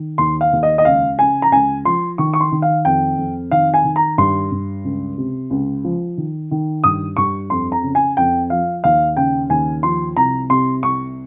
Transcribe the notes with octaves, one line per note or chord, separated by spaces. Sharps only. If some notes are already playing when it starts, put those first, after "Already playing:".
Already playing: D#3
D#2 C6
F5
D#2
D#5
D#5
C#2 F5
C#3 G#5
A#5
C#2 G#5
F3 C6
D#3 C#6
C#6
C6
D#3
F5
F2 G5
F2
D#3 F5
G#5
D#3
A#5
G2 C6
G2
C#2
C3
C#2
F3
D#3
D#3
G2 D#6
G2 C#6
F2 C6
A#5
C#3
G#5
F2 G5
F3 F5
D#2 F5
C#3 G5
D#2 G#5
F3 C6
C2 A#5
C3 C6
C2 C#6